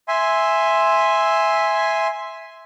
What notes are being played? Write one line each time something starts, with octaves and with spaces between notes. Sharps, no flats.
E5 G#5 C6